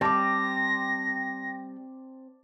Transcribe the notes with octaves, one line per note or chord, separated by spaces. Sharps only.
G3 C4 A5 D6 A#6